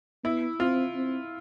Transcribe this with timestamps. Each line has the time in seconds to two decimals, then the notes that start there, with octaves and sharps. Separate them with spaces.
0.24 B3 E4
0.60 C4 F4
0.95 C4